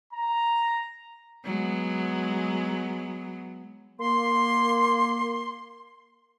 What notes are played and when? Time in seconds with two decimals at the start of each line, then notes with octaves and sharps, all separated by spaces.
0.12 A#5
1.44 F#3 G#3 B3
3.99 A#3 C6